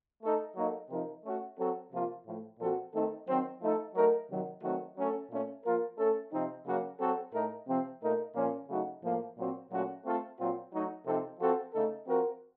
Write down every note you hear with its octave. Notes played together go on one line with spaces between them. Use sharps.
A3 D#4 A4
F#3 A#3 D#4 A4
C3 F3 C4 D#4 A#4
A3 C#4 F#4
F#3 C4 F#4 A4
C3 F3 A#3 F4
A2 F3 A3
A#2 F3 C4 F#4 A4
D#3 A3 C4 D#4 A4
D#3 F#3 C4
F3 A3 D#4 A4
F#3 A3 D#4 A#4
C3 D#3 F#3
D#3 F#3 A3 C4 F#4
F#3 A3 C#4 A4
A#2 A3 C#4
F3 A#3 F4 A#4
A3 C#4 A4
C3 F3 C4 D#4
C#3 F#3 A#3 C#4 F#4
F#3 C4 F#4 A4
A2 A3 D#4 A#4
C3 F3 C4
A#2 A3 D#4 A#4
A#2 F3 A#3 C#4
C#3 F#3 A3 D#4 F#4
A2 F3 A#3
A#2 F#3 C4 F#4
A#2 F#3 A3 C#4 F#4
A3 C4 F4 A4
A#2 F#3 C4 F4
F#3 A3 D#4
C3 F3 C4 D#4 A4
F3 C4 F#4 A4
C#3 A3 D#4 A4
F3 C4 F#4 A#4